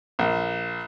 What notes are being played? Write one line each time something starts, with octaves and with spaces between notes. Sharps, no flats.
A#1